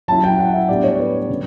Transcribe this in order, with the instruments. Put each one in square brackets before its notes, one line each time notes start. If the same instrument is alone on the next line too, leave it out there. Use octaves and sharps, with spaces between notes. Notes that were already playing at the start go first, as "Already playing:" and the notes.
[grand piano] F#3 C#4 E4 A5
G5
F#5
E5
A2 G3 B3 D4 D5
C#5
B4
C#3 F#3